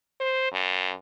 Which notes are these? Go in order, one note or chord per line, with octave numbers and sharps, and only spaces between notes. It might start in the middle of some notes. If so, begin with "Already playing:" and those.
C5
F#2